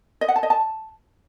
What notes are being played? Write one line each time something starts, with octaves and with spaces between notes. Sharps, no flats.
D#5
F#5
A5
D#5
A5